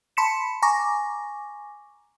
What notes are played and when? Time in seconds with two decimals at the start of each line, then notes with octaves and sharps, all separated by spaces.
0.17 A5 B5 C6 B6 C#7 E7
0.63 G#5 A#5 C#6 D6 A#6